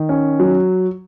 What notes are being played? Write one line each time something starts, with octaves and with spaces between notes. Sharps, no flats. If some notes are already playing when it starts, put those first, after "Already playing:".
Already playing: D#3
C#4
F#3